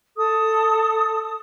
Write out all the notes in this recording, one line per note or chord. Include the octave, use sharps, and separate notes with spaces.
A4 D#6